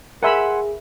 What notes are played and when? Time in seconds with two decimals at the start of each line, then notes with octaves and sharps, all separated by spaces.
0.23 G#4 A#4 E5 F#5 G#5 B5 C6